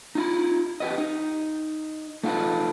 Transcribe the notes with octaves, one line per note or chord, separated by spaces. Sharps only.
D#4 F4 B5
G4 B4 D#5
D#4
A3 D#4 F4 A4 B4